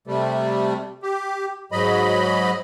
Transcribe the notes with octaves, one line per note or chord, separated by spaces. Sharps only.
C3 G3 A3
G4
G#2 F#3 D#5 B5